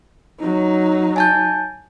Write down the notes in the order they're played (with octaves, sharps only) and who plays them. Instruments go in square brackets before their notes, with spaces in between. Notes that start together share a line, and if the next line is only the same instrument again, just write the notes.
[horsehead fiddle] F#3 D#4
[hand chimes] G#5 A5 G6